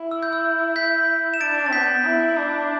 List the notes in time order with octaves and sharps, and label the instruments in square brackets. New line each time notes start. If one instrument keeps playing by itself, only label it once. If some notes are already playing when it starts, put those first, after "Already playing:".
Already playing: [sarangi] E4
[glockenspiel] E6
G6
E6
G6 B6
E7
[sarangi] D4 [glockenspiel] A6 D7
[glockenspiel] A6
[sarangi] B3 [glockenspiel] G6 B6
[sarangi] E4
D4